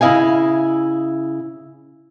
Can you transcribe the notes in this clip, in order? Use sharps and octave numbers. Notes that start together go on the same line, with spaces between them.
C#3 E4 D#5 F5 G#5